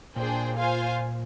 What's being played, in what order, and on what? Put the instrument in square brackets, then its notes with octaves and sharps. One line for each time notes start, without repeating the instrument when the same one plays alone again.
[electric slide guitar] A#2 [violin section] D4 G#4 C5 G5
[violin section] F4 C5 F5 G#5